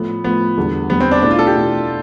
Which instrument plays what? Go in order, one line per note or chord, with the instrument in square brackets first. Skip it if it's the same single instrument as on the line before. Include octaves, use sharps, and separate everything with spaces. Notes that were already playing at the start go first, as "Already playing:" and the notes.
Already playing: [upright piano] A2 F3 A3 [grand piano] B3
[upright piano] A2 F3 A3 [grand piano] B3
[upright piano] E2 D3 G3
[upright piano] E2 D3 G3 [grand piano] B3
[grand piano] C4
D4
[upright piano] B2 A3 E4 [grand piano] D4
[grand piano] F4
A4
G4
[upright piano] B2 A3 E4